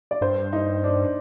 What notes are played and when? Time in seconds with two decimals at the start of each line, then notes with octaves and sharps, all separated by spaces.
0.11 D5
0.21 G2 C5
0.53 D#4
0.84 D4